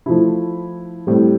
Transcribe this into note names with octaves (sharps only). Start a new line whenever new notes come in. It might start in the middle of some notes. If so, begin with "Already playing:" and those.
F3 A3 E4
A2 G3 C4